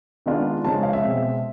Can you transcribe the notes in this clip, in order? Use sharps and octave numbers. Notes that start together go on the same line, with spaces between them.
D#3 G#3 B3 D4 F4
C#3 F3 G#3 C#4 A5
F5
E5
B2 G#3 C4